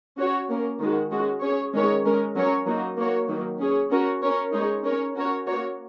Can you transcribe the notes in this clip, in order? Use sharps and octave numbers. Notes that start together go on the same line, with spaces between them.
C#4 F#4 C#5
A#3 C#4 A#4
D#3 G#3 F#4
G#3 C#4 F#4
C#4 G#4 C#5
D#3 G#3 C#4 A#4 C#5
G#3 C#4 A#4
F#3 C#4 A#4 C#5
F#3 A#3 D#4 F#4
A#3 F#4 A#4 C#5
D#3 F#3 A#3
C#4 G#4 C#5
C#4 F#4 A#4 C#5
C#4 A#4 C#5
G#3 D#4 G#4 C#5
C#4 A#4 C#5
C#4 F#4 A#4 C#5
A#3 F#4 A#4 C#5